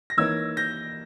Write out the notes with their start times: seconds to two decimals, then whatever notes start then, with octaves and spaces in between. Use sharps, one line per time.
0.10 A#6
0.17 E3 A#3 D#4 A#4 C#5 E6 G#6
0.57 G6 A#6